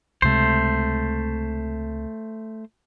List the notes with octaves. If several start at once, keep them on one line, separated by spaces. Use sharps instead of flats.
C#2 C3 G#3 A3 C5